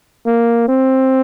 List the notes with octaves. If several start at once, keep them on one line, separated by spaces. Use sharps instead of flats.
A#3
C4